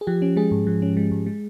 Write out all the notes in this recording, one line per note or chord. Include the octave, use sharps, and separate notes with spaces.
G#4
F3 G4
C#4
G#3 G#4
G#2
F3
C#4
G#3
G#2
G#3